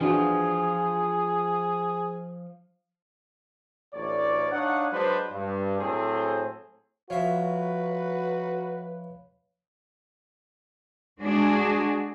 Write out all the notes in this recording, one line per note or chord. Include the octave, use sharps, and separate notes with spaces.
E3 F3 D4 F4 F#4 G#4
A1 D2 C#5 D5
D4 D#4 C#5 F5 F#5
F#3 G#3 D4 B4 C5
G2
A2 F#3 C4 G#4 A4 C5
F3 F#4 B4 C#5 E5 F5
G#3 D4 F#4 G#4